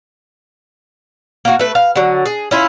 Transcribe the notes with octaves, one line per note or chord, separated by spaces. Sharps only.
A#3 F#4
A3 B4
F5
D3 F#3
G#4
C#4 E4 F4